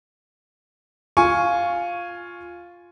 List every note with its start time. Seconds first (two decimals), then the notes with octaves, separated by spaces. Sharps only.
1.17 F4 G#5 C#6